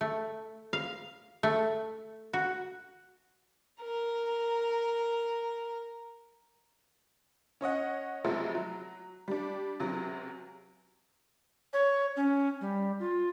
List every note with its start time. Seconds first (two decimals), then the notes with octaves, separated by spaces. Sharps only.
0.01 A3
0.73 F5
1.43 A3
2.33 F#4
3.82 A#4 A#5
7.61 C#4 C#5 D#5 F#5
8.25 F2 C3 F3 F#3 G#3 A3
8.55 F#3
9.28 G3 D4
9.80 C#2 C3 F#3
11.73 C#5
12.16 C#4
12.61 G3
13.00 F4